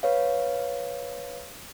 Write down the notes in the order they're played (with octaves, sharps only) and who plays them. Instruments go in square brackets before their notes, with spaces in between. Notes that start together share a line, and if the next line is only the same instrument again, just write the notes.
[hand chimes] B4 C#5 F5